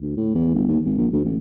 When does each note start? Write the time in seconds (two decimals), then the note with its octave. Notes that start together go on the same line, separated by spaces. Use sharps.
0.01 D2
0.17 A2
0.35 E2
0.54 G1
0.68 D#2
0.85 G#1
0.98 A#1
1.13 D2
1.25 A1